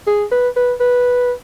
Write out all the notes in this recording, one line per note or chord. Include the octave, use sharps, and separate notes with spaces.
G#4
B4
B4
B4